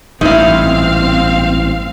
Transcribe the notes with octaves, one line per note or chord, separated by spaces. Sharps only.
A1 G2 A#2 C4 D#4 E4 F5